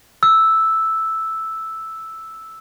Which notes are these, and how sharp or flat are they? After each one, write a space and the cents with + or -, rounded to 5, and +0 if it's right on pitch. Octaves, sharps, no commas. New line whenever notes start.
E6 -5